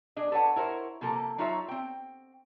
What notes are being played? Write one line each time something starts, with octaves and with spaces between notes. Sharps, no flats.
D4 G#4 D#5
A4 B4 C#5 F#5
E4 A#4 C5 C#5
C3 F3 A#3 A4
F#3 D#4 F4 C#5 E5
C4 G5